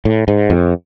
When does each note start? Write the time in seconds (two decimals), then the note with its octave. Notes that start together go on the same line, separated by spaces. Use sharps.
0.05 A2
0.28 G#2
0.50 F2